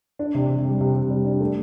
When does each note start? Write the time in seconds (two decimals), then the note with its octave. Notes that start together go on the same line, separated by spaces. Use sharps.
0.19 D4
0.35 C3
0.49 C3
0.65 G3
0.81 C3
0.95 C3
1.10 G3
1.26 D4
1.41 A3